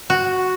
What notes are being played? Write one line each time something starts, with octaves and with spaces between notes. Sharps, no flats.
F#4